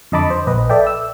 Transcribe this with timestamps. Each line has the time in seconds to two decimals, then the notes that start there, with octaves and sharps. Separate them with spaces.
0.12 F2 D3 D#5 A5 B5 D6
0.30 C5
0.47 A#1 B4 D#5
0.70 A4 D5 E5 G5
0.87 E6